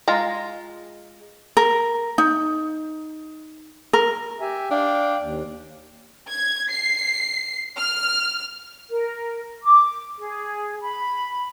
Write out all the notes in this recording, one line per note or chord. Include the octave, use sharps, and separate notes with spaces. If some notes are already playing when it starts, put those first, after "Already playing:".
G#3 F4 A#5
A#4
D#4
A#4
G4 E5 G#5
D4 F5 G5
D#2
G#6
C7
F6
A#4
D6
G#4
B5